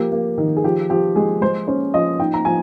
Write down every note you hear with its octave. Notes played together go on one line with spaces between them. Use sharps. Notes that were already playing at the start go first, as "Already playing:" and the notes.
Already playing: F3 A#3 G4
A#3
D#3
G#4
F3 G4
F3 G4
G#3 G#4
G#3 C5
C#4 C5
F3 D#5
D#4 G5
A#5
F3 G#5